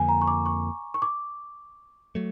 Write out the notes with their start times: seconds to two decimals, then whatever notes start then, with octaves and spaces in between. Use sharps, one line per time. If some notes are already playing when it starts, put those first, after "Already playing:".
Already playing: F2 D3 F3 A#3 G#5
0.08 A#5
0.22 C#6
0.27 D6
0.46 C#6
0.94 C#6
1.02 D6
2.15 F#3 A3